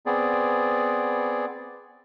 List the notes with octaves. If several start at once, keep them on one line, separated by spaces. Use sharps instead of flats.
B3 C4 G#4 D5